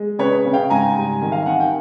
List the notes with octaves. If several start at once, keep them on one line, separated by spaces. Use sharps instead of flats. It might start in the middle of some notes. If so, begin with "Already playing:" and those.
Already playing: G#3
C#3 B4 C#5
C#3
F5 G5
G#2 G#5 A#5
G3
D#3
F5
D#3 F#5
G5